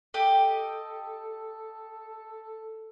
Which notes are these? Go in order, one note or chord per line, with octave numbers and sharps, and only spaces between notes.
G4 A4 D#5